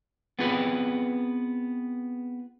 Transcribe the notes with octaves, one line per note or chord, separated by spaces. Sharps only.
B3 C4 F4 G#4 B4